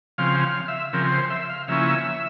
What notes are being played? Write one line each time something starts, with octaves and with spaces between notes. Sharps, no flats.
C#3 F3 C4 F5
F5
E5
C#3 F3 C4 A#4
C5
E5
F5
C#3 F3 A#3 C#4 E4 E5